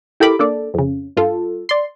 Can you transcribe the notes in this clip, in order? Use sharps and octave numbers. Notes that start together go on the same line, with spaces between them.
E4 G4 A4 A#4 B5 D6
A#3 D4 A4 D5
F2 C#3
G2 F4 A4
D5 C6